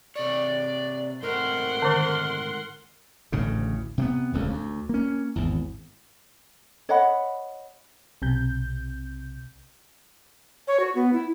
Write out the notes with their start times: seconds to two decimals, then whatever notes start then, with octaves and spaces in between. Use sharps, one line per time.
0.16 C3 C#5 D5
1.22 G#2 A3 C4 A#4 F#5 C6
1.82 D3 D#3
3.32 A1 D2 A2 C#3
3.98 C3 A#3 B3
4.33 D1 C#2 F#2
4.49 D2
4.89 A#3 C#4
5.36 G#1 E2
6.89 C#5 D#5 F#5 B5
8.22 B1 C3 G6
10.68 C#5
10.80 F#4
10.95 B3
11.13 E4